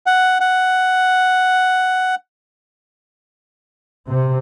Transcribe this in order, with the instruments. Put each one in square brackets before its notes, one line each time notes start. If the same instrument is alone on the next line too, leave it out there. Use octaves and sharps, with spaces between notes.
[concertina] F#5
F#5
[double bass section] C3